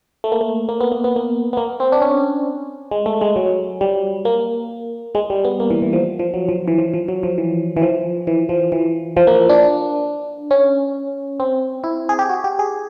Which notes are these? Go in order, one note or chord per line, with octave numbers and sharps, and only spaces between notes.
A3
A#3
A3
A#3
B3
A#3
B3
A#3
B3
A#3
C4
D4
C#4
G#3
A3
G#3
F#3
G3
A#3
G#3
G3
B3
A#3
E3
E3
F3
F3
F#3
F3
E3
F3
F3
F#3
F3
E3
E3
F3
E3
F3
E3
F3
A#3
D4
C#4
C4
E4
G#4
G4
F#4
G4
G#4